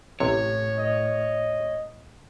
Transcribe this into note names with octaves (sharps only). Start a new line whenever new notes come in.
A1 A2 C3 C#5
D#5